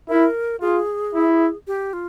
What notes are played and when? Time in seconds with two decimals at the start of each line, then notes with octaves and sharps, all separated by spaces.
0.09 E4 A#4
0.61 F4 G#4
1.15 E4
1.67 G4
1.93 F4